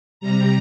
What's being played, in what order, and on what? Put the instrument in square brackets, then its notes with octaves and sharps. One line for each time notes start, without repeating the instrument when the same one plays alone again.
[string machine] C3 G3 A#5